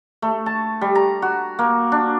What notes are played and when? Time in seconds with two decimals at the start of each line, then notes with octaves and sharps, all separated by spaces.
0.22 A3
0.46 A5
0.81 G3
0.95 A#5
1.22 F#4
1.59 A#3
1.92 D4